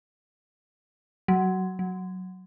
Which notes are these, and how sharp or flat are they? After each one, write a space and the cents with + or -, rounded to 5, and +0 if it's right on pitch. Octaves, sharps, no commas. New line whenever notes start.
F#3 +15
F#3 +0